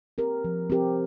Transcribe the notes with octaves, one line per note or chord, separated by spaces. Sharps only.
C4 G4 A#4
F3
C4 G4 A#4